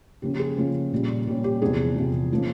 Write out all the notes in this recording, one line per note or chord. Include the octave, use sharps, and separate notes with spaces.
C#3 F3 A#3 C#4 G4
G4
G#4
C#3 F3 A#3 C#4 F4
A#2 G3 C#4
A#2 G3 C#4 G4
G4
E2 C3 F3 G#4
E2 C3 F3
F3 A#3 C#4